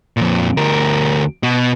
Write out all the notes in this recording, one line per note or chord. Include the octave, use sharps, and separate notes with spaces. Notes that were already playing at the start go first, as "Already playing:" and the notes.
F2 A#2
D2 A#4
B2